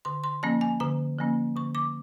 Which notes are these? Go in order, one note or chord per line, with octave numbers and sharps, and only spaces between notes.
D3 C6
C6
F3 A#3 C#4 A5
G#5
D3 A#5
F3 A#3 C#4
D3 C#6
D6